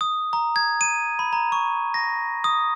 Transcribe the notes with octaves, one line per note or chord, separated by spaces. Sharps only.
D#6
A#5
G#6
D#7
B5
A#5
C#6
A#6
D#6